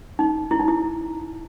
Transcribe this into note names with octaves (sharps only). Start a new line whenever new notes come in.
D#4
E4
D#4
E4